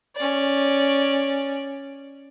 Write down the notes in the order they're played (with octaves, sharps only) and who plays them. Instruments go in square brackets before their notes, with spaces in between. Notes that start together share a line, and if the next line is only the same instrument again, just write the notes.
[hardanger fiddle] C#4 D5